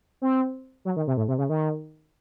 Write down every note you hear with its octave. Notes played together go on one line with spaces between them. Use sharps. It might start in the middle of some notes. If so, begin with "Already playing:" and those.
C4
F#3
D#3
C3
A2
C3
C#3
D#3